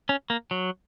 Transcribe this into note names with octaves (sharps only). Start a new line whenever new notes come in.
C#4
A#3
F#3